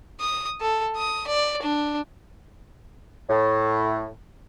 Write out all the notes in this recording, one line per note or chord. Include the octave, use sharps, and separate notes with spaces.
D#6
A4
D#6
D5
D4
A2